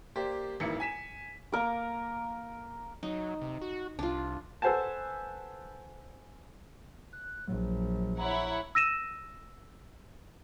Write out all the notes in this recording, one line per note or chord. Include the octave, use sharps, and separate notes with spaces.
A#3 G4 C5 D5
E1 A1 D#3 A#3 E4 C#7
G#5 B6 E7
A#3 A#4 D6
F#3 D#4
C3
F#4
C2 D4 F4
A4 B4 C5 F#5 G#5 A5
F#6
A#1 F#3
E4 C#5 F#5 A#5
E6 A#6 D#7 E7